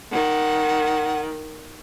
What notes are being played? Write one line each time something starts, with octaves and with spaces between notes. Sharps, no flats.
D#3 F#5